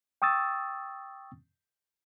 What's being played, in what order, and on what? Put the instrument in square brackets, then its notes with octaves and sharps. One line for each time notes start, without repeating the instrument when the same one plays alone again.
[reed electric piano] G5 C#6 D#6 E6 A6